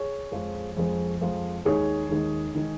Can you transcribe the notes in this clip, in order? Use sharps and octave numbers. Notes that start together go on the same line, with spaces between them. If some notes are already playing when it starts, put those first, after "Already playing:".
Already playing: G#4 C#5
F2 F3 G#3
F2 F3 G#3
F2 F3 G#3
D#2 D#3 G#3 G#4 C#5
D#2 D#3 G#3
D#3 G#3